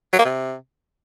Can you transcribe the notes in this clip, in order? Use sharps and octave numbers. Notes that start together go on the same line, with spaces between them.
F#3
A#3
C3